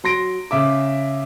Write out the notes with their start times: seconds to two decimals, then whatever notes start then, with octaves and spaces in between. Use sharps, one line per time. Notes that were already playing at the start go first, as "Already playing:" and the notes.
0.04 F#3 C6 A#6 D7
0.51 C#3 E5 D6